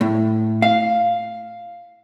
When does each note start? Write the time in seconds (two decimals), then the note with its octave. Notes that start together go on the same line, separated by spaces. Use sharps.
0.01 A2
0.62 F5